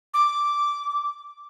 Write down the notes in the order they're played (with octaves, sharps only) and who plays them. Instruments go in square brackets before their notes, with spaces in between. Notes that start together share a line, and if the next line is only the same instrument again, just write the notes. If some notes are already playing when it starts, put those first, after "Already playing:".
[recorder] D6